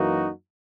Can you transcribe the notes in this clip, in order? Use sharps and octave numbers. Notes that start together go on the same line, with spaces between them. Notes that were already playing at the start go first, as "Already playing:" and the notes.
Already playing: F#2 E3 A#3 D#4 F#4